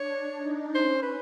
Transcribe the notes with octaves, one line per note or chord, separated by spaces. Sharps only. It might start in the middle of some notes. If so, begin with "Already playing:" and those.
Already playing: D4 C#5
D#4
C#4 C5
B4